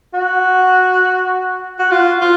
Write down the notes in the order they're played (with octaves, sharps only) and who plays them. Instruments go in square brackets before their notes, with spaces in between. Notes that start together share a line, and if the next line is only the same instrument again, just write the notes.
[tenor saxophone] F#4
F#4
F4
F4